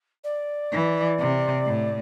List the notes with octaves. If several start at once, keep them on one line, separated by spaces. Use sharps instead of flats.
D5
E3
C3
A2